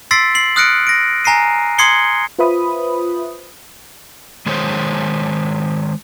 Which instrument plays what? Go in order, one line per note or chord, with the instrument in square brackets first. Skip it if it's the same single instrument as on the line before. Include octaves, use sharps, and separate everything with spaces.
[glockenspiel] C6 E6 A6 B6 C7 D7
C7 F#7
D#6 F6 F#6 A#6 C#7 D7
A#6 D7
G#5 A#5 A#6 C7 D#7
C6 D#6 G#6 C7 C#7 G7
[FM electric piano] F4 B4 C5 E5 B5 D#6
[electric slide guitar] D#3 G#3 G#4 C5 C#5